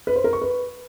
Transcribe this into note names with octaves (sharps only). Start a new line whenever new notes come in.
B4
C5
A#4
C#6
B4